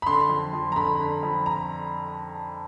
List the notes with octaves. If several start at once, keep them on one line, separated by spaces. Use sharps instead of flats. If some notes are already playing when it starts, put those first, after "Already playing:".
B5
D3 C6
F2
F2
A#5
D3 B5
D3
F2
A#5